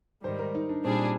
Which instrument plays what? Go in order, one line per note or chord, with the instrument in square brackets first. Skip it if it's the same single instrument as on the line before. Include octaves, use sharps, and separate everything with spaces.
[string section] G#2 D#3 G3 [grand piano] C5
[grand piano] A#4
D#4
D4
[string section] A#2 G3 D4 G#4 [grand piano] C4